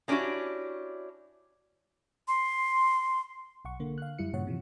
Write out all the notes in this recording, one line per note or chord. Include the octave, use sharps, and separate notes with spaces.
G#3 C#4 D4 E4 F#4 G4
C6
B1 F#5 C#6
D3 A#3
F5 F#6
F#2 G3 E4 C#7
G2 A#2 C#3 C#5 F#5
C3 E3 F3